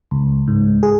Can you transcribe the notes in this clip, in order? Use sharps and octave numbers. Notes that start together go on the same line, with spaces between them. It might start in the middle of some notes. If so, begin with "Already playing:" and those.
C#2
G#2
G#4